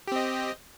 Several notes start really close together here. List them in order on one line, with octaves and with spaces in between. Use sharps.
G4 C4 D#5